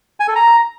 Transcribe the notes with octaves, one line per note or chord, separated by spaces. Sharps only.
G#5
A4
A#5